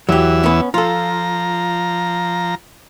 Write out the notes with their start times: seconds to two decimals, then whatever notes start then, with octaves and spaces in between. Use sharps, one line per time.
0.09 E2 E3 F#3 G4 E6
0.43 B3 C#4
0.74 F3 F4 A4 A#5